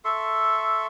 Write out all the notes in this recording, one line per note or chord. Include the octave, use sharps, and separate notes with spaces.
A4 E5 C6 C#6